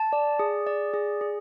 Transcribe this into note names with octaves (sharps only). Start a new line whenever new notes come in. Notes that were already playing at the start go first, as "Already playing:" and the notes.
Already playing: A5
D5
G#4
D5
G#4
G#4